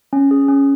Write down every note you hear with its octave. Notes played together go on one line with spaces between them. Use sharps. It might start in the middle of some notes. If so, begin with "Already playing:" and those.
C#4
G#4
C#4